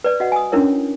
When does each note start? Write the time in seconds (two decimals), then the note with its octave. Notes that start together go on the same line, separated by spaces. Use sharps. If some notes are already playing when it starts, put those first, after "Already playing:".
0.04 B4 D5
0.20 F#4 D#5 F#5
0.32 G#5 D#6
0.52 C#4 D4 E4 A#4 C#5